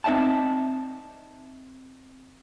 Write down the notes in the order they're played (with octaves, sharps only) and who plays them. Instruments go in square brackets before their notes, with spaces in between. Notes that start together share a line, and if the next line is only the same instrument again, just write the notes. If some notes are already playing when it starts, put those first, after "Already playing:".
[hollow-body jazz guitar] C4 D#4 D5 E5 G5 A5